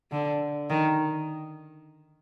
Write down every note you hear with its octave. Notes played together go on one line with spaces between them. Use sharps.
D3
D#3